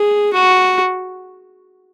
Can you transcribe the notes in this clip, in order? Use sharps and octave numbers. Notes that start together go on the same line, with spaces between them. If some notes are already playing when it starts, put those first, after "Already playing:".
Already playing: G#4
F#4